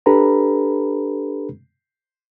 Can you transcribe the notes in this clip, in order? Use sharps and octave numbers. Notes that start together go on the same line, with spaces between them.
D4 G4 A4 B4 A#5 B5